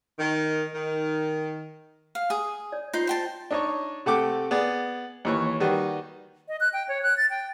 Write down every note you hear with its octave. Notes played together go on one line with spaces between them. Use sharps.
D#3
D#3
F5
G#4 D#6
C#5 D5
D#4 F4 C5 C6
C5 G5 A5
D4 D#4 C#5
C3 A3 A4 F#5 G5 D6
B3 G#4 D5
D#2 E3 C#5
D#3 G3 F#4 B4
D#5
F#6
G5
C#5
F#6
A6
G5